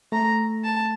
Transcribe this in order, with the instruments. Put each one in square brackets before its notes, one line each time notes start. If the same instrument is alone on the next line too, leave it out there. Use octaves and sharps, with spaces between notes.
[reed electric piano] A3 [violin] A#5
[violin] A5